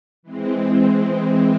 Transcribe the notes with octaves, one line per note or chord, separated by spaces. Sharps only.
E3 G#3 C4